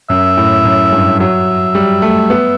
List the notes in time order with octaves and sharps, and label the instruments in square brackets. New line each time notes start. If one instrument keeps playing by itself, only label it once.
[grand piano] F#2 [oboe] E5
[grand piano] A2
F#2
G2
[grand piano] F#3 [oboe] E5
[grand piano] G3
A3
B3